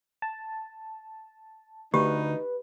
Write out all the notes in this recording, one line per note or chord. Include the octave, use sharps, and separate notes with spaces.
A5
D2 D#4 G4 B4